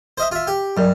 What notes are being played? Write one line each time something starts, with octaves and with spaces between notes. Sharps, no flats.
C5 D#5 E5
F4 E5
G4
G2 F#3 A#4 D5